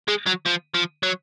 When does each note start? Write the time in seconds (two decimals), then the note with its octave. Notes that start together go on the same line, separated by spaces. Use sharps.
0.09 G#3
0.27 F#3
0.46 F3
0.74 F3
1.03 F#3